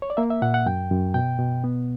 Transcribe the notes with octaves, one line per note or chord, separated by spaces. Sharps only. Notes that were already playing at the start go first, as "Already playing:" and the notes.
C#5
D5
A#3 E5
E5
A#2 F#5
F#5
F#2 G5
F#2
B2 G5
B2
B3